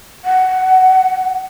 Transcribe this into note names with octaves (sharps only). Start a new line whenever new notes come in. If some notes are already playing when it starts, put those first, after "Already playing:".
F#5